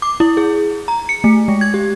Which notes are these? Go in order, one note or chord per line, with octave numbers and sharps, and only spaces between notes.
D6
E4
G#4
A#5
C#7
A3
G#3
G#6
G4